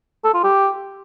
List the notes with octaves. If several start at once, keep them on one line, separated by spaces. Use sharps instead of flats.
A4
F4
G4